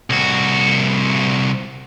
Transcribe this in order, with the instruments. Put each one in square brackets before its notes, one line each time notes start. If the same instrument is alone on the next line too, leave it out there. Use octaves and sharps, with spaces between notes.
[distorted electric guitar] C2 F#4